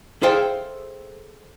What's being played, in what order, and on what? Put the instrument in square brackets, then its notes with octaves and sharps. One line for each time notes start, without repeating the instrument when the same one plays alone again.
[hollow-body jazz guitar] G#4 A4 C5 E5 F5 G5